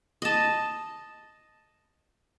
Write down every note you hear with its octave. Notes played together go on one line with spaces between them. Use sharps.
D#5 A5